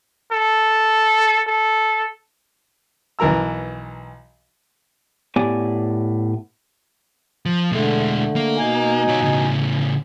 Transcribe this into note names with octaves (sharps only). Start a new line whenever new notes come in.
A4
A4
B1 E3 A#4 A#5 E6
A2 B3 G4 C#5 D5 G#5
F3
B2 D3 G#3 A3
A#3
B2 D#4 G#5
F4 C#5
A2 C#3